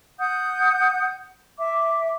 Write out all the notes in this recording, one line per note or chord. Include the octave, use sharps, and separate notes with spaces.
F#5 D#6 G6
E5 D6